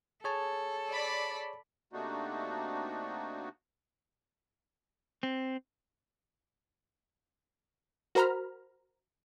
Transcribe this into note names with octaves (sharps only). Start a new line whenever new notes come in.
G#4 A4 C#5 A5
D5 B5
C3 A3 A#3 D4 D#4 F#4
C4
F#4 A#4 C5 A#5 B5 F6